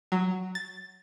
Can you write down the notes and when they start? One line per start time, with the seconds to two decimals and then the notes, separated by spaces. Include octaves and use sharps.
0.12 F#3
0.55 A6